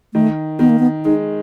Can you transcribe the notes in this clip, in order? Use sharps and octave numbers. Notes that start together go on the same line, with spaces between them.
D#3 A3
D#3 B3
A#3
B3
G#3 D#4